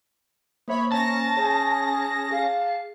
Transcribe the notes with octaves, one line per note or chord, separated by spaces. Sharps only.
A#3 C5 C#5 E5 B5
C#4 A5 A#5 A#6
G#4 C#5
G#4 F5